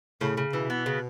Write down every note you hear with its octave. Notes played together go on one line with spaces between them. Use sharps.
A2 C#3
C#3
B2 E3
B3
C#3